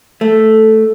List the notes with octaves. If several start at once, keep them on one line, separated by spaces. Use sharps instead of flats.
A3